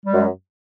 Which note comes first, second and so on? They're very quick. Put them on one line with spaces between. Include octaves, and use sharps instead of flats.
G3 G#3 F#2